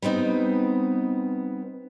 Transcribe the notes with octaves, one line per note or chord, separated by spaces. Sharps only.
G3 B3 C4 D#4